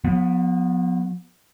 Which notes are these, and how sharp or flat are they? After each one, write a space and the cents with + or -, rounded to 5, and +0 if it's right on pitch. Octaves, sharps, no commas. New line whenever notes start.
F3 +45 B3 +0